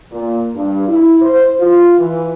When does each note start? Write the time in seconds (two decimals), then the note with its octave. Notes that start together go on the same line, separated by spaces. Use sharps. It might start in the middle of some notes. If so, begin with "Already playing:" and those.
0.11 A#2
0.56 G2
0.88 E4
1.22 C5
1.60 F4
1.98 E3